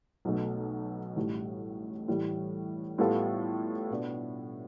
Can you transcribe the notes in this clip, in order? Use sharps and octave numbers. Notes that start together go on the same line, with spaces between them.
B1 B2 A3
A1 A2 G3
A2 E3 G3
A2 G3 B3 F4 A4
B2 B3 D4